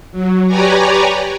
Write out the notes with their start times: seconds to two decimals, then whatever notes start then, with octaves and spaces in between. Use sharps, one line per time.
0.11 F#3
0.46 G4 B4 C#5 D5 G#5 A#5